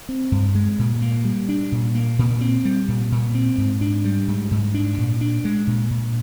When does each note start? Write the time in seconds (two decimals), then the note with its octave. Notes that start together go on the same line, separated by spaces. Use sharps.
0.09 C4
0.32 G2
0.55 G#3
0.79 A#2
1.02 A#3
1.25 G3
1.49 D4
1.72 A#2
1.95 A#3
2.19 A#2
2.41 C4
2.65 G3
2.88 A#2
3.12 A#2
3.34 C4
3.58 G#2
3.81 D4
4.05 G3
4.28 G#2
4.51 G#2
4.74 D4
4.98 A#2
5.21 D4
5.45 G#3
5.67 A#2
5.91 A#2